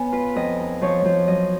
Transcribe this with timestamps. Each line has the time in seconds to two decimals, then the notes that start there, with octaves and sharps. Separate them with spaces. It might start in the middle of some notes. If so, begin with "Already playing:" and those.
Already playing: B3 C#5 G#5
0.12 F4 B4
0.36 F2 D#5
0.60 D#4
0.82 F3 C#5
1.05 F3
1.27 F#3 D#5